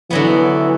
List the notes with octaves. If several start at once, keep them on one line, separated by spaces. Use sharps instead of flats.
D3 E3 F#3 B3